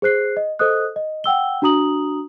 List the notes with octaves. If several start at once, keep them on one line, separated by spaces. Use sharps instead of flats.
G#4 C5 F#6 C7
D#5
A4 C5 D#5 D#6 F#6
D#5
F#5 G5 E6 G7
D4 F#4 A#5 D#6 F#7